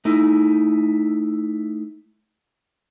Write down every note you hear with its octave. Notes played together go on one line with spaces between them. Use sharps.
A3 D#4 E4